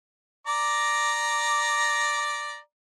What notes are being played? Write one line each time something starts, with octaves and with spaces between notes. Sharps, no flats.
D5 A#5 D6